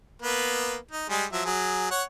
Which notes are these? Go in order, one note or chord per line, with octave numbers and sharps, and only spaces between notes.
A#3 B3 B4
D#4
G3 G#3 G#4
F3 F#3 E5
F#3 G#4
C#5 F#5